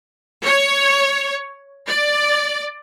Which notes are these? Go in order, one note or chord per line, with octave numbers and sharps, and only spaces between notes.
C#5
D5